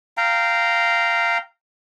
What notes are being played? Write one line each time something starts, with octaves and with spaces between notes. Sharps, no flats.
F5 G5 A#5